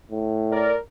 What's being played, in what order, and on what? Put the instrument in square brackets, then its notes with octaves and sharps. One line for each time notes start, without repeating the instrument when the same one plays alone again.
[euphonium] A2
[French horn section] A#4 D5